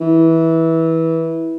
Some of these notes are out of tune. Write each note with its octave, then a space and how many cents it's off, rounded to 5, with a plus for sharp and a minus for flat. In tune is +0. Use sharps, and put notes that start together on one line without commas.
E3 -15